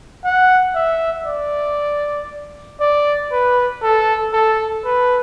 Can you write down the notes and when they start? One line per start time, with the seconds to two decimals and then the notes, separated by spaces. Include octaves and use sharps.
0.25 F#5
0.75 E5
1.26 D5
2.80 D5
3.32 B4
3.83 A4
4.33 A4
4.85 B4